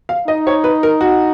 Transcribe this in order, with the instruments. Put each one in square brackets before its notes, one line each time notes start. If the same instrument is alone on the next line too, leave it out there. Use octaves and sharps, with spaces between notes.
[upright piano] F5
[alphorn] D#4 [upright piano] D#5
[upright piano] C#5
B4
A#4
F#4